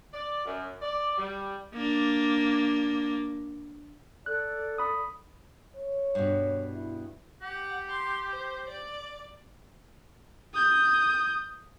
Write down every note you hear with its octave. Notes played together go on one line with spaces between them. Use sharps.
D5
F#2
D5
G3
A#3 D4
A4 D5 F#6
B5 D#6
C#5
G2 B2
E4
G4 F#5
C6
C5
D5
D#6 G6